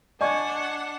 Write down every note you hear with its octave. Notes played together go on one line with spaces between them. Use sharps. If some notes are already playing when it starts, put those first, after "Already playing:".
D4 D5 D#5 F#5 G#5 C#6 G#6